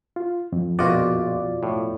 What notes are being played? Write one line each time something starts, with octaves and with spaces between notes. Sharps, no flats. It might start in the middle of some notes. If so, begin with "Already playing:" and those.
F4
F2
A#1 B2 F4 F#4 D5 D#5
A2